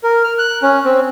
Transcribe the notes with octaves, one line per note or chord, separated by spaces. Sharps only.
A#4
F6
F#6
C#4
C4